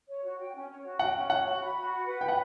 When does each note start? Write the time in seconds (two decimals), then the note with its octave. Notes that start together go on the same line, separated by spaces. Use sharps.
0.08 C#5
0.23 F#4
0.39 G5
0.54 C#4
0.69 C#5
0.84 F#4
0.99 F#5 G5
1.14 C#4
1.29 C#5 F#5
1.45 F#4
1.61 B5
1.75 F#4
1.91 F#5
2.05 B4
2.21 G5 B5
2.28 F#5